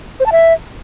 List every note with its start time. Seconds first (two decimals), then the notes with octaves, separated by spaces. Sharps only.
0.20 C5
0.26 A5
0.32 E5